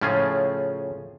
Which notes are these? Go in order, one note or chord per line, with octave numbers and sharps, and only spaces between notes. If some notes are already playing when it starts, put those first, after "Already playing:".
A2 C#3 F3 C#4 F4 G#4